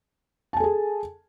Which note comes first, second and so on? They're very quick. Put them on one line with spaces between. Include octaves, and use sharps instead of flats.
A5 G#5 A4 G#4